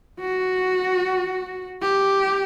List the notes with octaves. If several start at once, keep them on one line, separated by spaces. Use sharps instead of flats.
F#4
G4